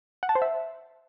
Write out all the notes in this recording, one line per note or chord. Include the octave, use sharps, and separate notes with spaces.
F#5
A5
C5
E5